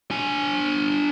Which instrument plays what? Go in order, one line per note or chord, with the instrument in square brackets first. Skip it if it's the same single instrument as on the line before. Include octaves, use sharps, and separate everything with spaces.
[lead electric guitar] D4 G#5